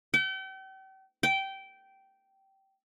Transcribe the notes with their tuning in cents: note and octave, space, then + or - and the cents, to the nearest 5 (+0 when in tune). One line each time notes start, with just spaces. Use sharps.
G5 -40
G5 -15